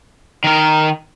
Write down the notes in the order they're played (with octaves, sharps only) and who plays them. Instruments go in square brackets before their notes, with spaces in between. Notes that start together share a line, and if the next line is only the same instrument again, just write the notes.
[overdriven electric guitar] D#3 A#4